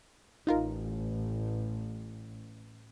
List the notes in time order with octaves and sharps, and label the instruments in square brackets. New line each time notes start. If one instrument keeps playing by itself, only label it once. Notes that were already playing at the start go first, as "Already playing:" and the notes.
[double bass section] A1 [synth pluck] D#4 F4 A#4